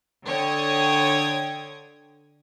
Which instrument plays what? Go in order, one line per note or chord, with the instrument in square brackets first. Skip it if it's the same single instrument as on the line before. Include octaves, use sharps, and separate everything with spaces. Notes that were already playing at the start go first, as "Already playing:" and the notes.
[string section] D3 C#5 G5 D#6 G#6